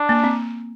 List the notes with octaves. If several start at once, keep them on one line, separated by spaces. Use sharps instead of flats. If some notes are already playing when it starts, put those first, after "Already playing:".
Already playing: D4
A#3
C4